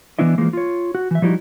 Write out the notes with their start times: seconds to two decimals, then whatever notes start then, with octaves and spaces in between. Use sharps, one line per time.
0.19 E3 G3 B3 D4 E4 D#5
0.38 E3 F3 G#3 A#3
0.53 F4 C#5
0.95 F#4
1.11 E3 E5
1.22 F3 G3 D#4 E4 F#4